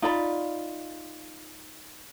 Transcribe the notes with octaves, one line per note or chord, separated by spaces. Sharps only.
D#4 F4 D5 B5